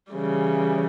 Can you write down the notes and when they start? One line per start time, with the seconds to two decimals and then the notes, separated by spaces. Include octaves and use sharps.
0.12 C#3 E3 G3